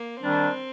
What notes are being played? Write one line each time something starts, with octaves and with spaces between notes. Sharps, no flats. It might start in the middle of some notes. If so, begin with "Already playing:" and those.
Already playing: A#3
D#3 G3 C4 D4